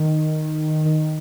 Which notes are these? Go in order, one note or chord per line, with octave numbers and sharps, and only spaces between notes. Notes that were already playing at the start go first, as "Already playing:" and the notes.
Already playing: D#3
D#3